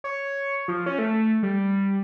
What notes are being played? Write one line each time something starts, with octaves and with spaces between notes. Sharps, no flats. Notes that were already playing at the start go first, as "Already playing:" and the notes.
C#5
F3
C#4
A3
G3